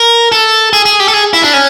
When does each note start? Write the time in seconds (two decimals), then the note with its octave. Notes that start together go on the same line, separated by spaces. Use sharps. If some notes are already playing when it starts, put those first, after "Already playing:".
Already playing: A#4
0.32 A4
0.73 G#4
0.86 G#4
1.00 G4
1.08 A4
1.13 G#4
1.33 E4
1.43 D4
1.53 C#4